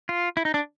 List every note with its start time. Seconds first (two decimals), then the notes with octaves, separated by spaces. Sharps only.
0.09 F4
0.37 E4
0.45 D#4
0.54 D4